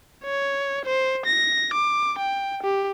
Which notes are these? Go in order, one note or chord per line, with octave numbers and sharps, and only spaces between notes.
C#5
C5
A#6
D6
G5
G4